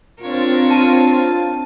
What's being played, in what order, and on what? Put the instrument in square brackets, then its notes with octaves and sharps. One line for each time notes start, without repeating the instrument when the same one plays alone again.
[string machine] C4 A6 [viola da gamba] D4 A#4 C#5 [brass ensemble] F4
[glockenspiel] A5 D#7